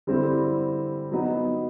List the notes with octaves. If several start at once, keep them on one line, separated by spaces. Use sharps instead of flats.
D3 G3 C4 E4
F#3 B3 D#4